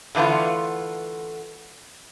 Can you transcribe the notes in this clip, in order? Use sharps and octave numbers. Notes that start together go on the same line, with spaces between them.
D3 E3 A3 B3 F4